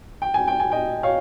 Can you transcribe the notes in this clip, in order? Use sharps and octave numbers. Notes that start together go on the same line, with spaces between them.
G5
G#5
G5
G#5
D#5 G5
C#5 F5